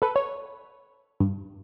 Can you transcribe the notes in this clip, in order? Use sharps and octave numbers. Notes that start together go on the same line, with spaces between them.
A4 B4
C#5
G2